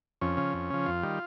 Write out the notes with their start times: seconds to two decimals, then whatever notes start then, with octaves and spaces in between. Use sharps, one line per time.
0.21 F2 C#4
0.37 C#3 F3
0.54 F2
0.70 C#3 F3
0.86 F2 F4
1.03 D#3 G3